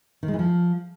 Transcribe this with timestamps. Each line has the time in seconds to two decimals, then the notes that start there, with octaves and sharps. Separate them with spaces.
0.23 D#3
0.28 G#3
0.33 E3
0.39 F3